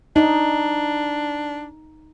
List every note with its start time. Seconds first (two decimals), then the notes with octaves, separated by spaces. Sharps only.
0.16 D4 D#4